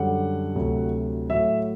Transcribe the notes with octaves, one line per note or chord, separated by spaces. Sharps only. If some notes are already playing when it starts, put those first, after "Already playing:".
Already playing: F#2 D3 G3 F#5
D2 C3 F#3
A2 F#3 E5